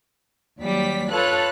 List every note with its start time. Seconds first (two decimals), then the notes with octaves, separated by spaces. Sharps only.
0.60 D#2 F#3 G3 D5 B6
1.11 F4 A4 B4 C#5 A5 F#6